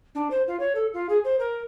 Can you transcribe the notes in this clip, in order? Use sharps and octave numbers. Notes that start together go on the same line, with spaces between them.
D4
C5
F4
C#5
A4
F4
G#4
C5
A#4